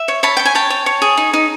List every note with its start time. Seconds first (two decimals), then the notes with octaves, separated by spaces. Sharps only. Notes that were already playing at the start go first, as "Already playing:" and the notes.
Already playing: E5
0.08 C#5
0.23 C#5 A5 B5
0.37 C#5 G5
0.45 G#5
0.55 C#5 G5 A5
0.70 C#5
0.86 C#5
1.02 G#4
1.17 D#4
1.33 D#4